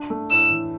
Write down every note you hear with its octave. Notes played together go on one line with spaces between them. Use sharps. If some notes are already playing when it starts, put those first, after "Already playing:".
Already playing: D4
A3
A2 E6
E3